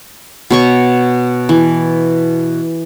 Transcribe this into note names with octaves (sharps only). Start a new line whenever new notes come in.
B2 C#5 C#6
E3